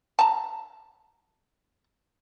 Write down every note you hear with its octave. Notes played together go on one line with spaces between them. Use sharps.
A5 A#5